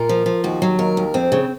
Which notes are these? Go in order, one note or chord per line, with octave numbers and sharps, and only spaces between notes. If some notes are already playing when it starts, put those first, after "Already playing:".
Already playing: A#2 A#4
F3
F3
D#2 F#4
F#3
D#2 A#4
D#2
F2 C4
C#3